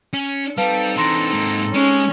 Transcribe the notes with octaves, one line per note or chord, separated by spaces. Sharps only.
C#4
G3 C4 D#4 A4 B4 F5 A5
E3 D4 A#5 C6 A#6
G#2 A#3
G#3 C#4